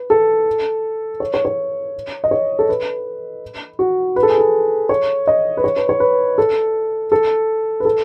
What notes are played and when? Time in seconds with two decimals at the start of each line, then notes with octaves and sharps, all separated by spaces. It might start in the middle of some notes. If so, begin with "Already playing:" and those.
Already playing: B4
0.10 A4
1.20 C#5
1.34 C#5
1.45 C#5
2.24 D#5
2.31 C#5
2.59 A4
2.69 B4
3.79 F#4
4.16 B4
4.23 A4
4.30 G#4
4.38 A4
4.89 C#5
5.27 D#5
5.57 B4
5.64 C#5
5.76 B4
5.89 C#5
6.00 B4
6.38 A4
7.12 A4
7.80 B4
7.85 A4